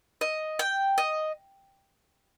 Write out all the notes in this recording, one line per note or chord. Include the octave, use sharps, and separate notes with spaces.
D#5
G5
D#5